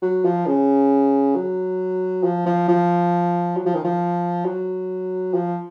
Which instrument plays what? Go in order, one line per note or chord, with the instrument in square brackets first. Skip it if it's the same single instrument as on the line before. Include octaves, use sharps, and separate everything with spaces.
[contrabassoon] F#3
F3
C#3
F#3
F3
F3
F3
F#3
F3
D#3
F3
F#3
F3